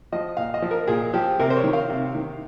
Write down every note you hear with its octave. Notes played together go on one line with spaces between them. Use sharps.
F3 D#5
A#2 F5
D#5
F3
A#4
A#2 G#4
F3 G4
C3 A#4
C5
C#5
D#3
F5
C3
D#3